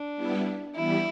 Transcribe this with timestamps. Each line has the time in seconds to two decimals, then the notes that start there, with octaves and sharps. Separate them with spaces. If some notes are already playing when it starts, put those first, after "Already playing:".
Already playing: D4
0.16 G3 B3 E4
0.76 E3 G3 B3 E4